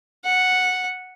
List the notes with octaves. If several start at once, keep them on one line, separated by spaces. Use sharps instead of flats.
F#5